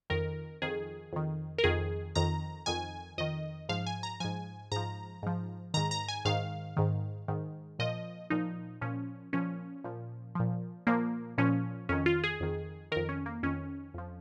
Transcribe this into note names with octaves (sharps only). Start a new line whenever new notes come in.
F2 D#3 A#4
F2 D#3 G#4
F2 D#3
A#4
F2 D#3 G#4
F2 D#3 A#5
F2 D#3 G#5
F2 D#3 D#5
G#2 F3 F5
G#5
A#5
G#2 F3 G#5
G#2 F3 A#5
G#2 F3
G#2 D#3 A#5
A#5
G#5
G#2 D#3 F5
G#2 D#3
G#2 D#3
A#2 F3 D#5
A#2 F3 D#4
A#2 F3 C#4
A#2 F3 C#4
A#2 F3
A#2 F3
A#2 F3 A#3
A#2 F3 C#4
F2 D#3 C#4
F4
G#4
F2 D#3
F2 D#3 A#4
C#4
A#3
F2 D#3 C#4
F2 F3